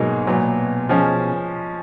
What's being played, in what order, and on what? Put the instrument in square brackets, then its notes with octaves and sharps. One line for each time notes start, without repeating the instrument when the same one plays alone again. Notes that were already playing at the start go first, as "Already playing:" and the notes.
Already playing: [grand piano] G#2 F#3 A#3 D#4 G#4 [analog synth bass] B2
[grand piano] A#2 F#3 B3
F3 G#3 C#4